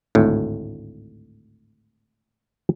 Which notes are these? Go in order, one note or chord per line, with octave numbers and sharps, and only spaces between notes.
G#1 D2 A2